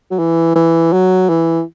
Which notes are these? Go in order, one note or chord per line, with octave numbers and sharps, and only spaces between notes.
F#3
E3
E3
F#3
E3